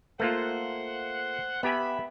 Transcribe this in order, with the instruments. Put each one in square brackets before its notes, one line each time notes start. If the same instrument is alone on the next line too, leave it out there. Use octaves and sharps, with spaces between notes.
[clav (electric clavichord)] A3 A#3 F4 [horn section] C5 F#5
[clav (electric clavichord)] B3 G4 G#5 [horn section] E5 B5